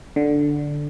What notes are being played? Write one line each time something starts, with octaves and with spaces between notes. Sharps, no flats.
D3